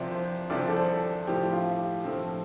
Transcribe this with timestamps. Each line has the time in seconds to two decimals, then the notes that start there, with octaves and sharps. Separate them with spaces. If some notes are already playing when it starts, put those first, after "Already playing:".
Already playing: C2 C3 F3 C4 D5
0.11 C5
0.50 C2 C3 F3 C4 D5
0.59 C5
0.67 A4
0.76 C5
1.27 A2 F3 C4 G4
1.53 F4
1.78 G4
2.04 A2 F3 C4 A4